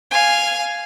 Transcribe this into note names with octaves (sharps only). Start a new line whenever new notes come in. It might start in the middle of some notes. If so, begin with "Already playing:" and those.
F5 G#5